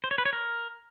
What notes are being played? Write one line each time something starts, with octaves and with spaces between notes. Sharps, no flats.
C5
C#5
B4
C#5
A#4